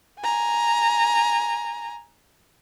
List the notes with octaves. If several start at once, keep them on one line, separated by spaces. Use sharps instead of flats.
G#5 A#5